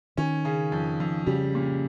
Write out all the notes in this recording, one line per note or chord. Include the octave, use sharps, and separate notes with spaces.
D#3 C#4
C#3
F2
F2
C#3 G3
A#2